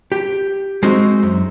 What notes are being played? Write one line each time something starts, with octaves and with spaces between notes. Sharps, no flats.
G4
G#3 C4 D#4 F#4 D#5
F#2